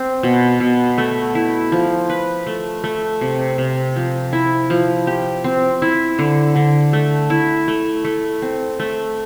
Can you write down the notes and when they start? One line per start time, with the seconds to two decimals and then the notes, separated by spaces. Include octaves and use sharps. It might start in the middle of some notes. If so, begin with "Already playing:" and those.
Already playing: C4
0.23 B2
0.60 B2
0.98 A3
1.35 E4
1.72 F3
2.09 B4
2.47 A3
2.84 A3
3.21 C3
3.58 C3
3.96 F3
4.33 E4
4.70 F3
5.07 G4
5.44 C4
5.82 E4
6.19 D3
6.56 D3
6.93 A3
7.30 E4
7.68 A3
8.05 A3
8.42 C4
8.80 A3